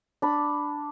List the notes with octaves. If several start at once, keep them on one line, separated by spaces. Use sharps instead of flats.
D4 B5